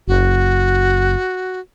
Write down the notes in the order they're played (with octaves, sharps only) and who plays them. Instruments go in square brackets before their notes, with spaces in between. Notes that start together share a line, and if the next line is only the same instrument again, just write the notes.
[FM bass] F#1 [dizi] F#4